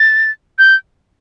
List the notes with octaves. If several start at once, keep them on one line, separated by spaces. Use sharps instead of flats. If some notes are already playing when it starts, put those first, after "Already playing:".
Already playing: A6
G6